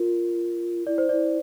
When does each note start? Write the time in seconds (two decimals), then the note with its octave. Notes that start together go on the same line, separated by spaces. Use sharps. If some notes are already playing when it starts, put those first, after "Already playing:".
Already playing: F4 A#4
0.87 E4 D5
0.98 C5
1.09 E4 D5